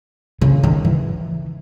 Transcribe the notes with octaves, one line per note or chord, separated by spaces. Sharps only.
C#3
D#3
E3